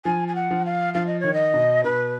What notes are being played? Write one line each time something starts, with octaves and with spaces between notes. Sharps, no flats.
F3 G#5
G#5
F#5
F3
F5
F3 F5
D#5
D#3 C#5
D#5
B2
B2 B4